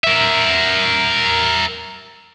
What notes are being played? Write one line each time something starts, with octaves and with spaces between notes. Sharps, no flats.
A#4 E5